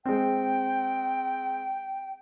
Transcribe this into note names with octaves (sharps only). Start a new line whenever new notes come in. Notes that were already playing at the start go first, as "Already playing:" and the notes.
G#3 C4 G5